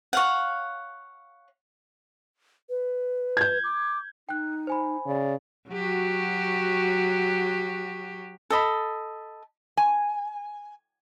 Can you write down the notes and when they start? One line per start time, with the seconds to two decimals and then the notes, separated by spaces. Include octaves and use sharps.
0.13 C#5 F5 F#5
2.70 B4
3.37 G6 G#6
3.64 D6
4.29 D#4 G5 F#6
4.67 C5 G#5 B5
5.06 C#3 D5
5.70 F#3 F#4 G4
8.50 A4 D#5 B5
9.77 G#5